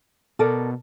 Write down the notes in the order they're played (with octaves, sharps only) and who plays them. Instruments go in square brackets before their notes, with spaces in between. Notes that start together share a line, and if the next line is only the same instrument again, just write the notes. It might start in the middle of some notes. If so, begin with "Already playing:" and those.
[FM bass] B2 [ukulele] A4 A#4 D5